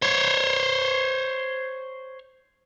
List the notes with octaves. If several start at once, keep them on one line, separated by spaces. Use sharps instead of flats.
C5 C#5